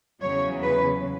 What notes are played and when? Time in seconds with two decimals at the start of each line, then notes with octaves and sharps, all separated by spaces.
0.21 E2 C#3 F#3 C#5
0.63 B4